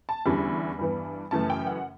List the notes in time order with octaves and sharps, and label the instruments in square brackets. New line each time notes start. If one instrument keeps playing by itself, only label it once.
[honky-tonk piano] A5
E2 D3 G3 C#4 E4 B5
G2 E3 B3
F#2 C#3 E3 A3 C#4 A5
G5
F#5